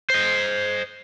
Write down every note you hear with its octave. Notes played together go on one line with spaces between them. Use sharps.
C5 D#5